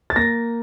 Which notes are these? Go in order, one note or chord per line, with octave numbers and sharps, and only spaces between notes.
A6
A#3 A#6